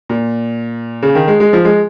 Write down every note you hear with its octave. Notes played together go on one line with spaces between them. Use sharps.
A#2
C#3
D#3
G#3
G#3
F3
G#3